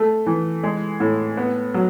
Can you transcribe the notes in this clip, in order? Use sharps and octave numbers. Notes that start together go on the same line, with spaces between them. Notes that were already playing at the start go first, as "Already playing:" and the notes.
Already playing: A3
E3
G#3
A2
B3
F#3